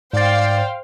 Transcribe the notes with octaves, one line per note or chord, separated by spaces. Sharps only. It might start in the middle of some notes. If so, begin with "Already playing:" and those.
G#2 C5 D5 F5 G5 A6